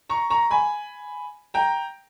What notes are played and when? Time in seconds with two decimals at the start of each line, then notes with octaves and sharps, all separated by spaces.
0.09 A#5 C#6
0.30 A#5 C#6
0.51 G#5 B5
1.54 G5 A#5